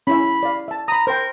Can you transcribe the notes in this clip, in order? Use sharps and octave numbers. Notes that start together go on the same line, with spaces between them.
C#4 E4 E5 B5
D5 F5
E5 A5
A#5 B5 D#6
A#4 C5 G5